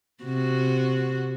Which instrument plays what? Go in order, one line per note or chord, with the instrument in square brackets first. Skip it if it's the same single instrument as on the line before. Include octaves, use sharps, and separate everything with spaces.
[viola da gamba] C3 F#4